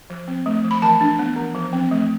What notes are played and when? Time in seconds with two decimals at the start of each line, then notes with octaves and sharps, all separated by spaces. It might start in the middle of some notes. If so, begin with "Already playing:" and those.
0.10 F3
0.28 C4
0.46 A3
0.64 F3
0.71 B5
0.82 E3 A5
1.01 D4
1.19 B3
1.36 E3
1.55 F3
1.73 C4
1.91 A3